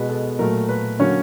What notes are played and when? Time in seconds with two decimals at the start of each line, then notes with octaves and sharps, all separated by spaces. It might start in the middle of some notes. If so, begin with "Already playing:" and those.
Already playing: B2 G#3 B3 B4
0.09 A4
0.39 A#2 F#3 A3 A#4
0.69 B4
0.99 D3 F#3 A#3 C#4 C#5